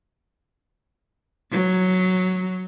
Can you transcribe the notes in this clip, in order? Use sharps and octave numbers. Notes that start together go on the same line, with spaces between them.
F#3